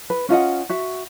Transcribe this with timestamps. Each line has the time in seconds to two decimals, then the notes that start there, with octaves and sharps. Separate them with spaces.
0.10 B4
0.29 C#4 F4 D#5 F#5
0.69 F#4 E5